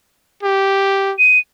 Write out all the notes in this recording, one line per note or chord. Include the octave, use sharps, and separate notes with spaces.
G4
D#7